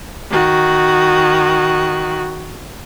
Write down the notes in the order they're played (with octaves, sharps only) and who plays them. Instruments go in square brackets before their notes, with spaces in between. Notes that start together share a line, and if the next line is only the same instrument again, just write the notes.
[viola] D#3 F#4